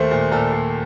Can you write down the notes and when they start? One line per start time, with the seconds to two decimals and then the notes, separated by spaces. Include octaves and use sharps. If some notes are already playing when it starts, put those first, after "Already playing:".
Already playing: D#2 A3 C5
0.11 A#2
0.32 A#2 A4
0.52 A#2